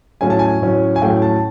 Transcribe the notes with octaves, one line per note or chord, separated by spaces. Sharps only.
A2 F#3 A3 C#4 G#5
A5
G#5
A2 F#3 A3 C#4
G#5
A2 F#3 A3 C#4 G5
A5